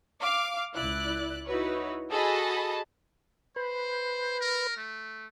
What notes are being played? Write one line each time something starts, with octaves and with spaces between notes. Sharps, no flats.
F5 D6
C#2 E4 D5 F#6
D#4 E4 F#4 B4 C#5
F#4 G#4 A4 D#5 A5 B5
B4 C5
A#4
A3